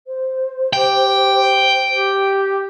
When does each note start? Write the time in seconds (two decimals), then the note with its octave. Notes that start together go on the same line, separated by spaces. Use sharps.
0.06 C5
0.73 G4 G5
1.95 G4